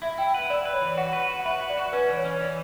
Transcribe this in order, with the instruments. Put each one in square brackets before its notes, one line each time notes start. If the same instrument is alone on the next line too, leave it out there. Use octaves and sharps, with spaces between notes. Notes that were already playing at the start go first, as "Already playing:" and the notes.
[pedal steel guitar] E4 [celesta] E5
[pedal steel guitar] E4 [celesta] G5
[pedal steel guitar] B4 [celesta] F#5
[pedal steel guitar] E4 [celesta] D5
[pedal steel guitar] B4
[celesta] C#5
[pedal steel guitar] E3
[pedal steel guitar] F#4 [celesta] F#5
[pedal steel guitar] B4
F#4
[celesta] F#5
[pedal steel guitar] B4 [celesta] E5
[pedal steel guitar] F#4
[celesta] D5
[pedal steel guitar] F#4
[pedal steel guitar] C#4 [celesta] B4
[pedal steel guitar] E3
[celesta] C#5
[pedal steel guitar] C#4
[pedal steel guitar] E3 [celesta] D5